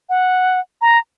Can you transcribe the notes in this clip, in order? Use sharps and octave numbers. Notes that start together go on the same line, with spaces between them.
F#5
A#5